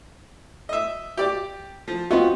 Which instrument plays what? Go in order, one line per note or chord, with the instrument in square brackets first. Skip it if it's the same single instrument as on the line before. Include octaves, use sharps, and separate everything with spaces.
[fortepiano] D#5 E5
G4 D5
F3
[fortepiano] B3 D#4 [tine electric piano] C4 F4 F#4